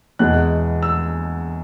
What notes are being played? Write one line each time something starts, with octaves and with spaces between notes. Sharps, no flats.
E2 B2 G#3 F#6
E6